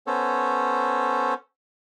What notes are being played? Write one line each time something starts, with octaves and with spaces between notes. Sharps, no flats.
B3 C#4 A4 C5 C#5